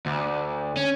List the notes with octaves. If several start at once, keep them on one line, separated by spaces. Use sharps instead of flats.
D2
C#4